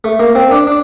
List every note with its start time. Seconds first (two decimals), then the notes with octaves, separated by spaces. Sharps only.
0.04 A3
0.20 A#3
0.35 C4
0.51 D4
0.67 D4